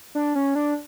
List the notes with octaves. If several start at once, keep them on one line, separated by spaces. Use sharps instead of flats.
D4
C#4
D4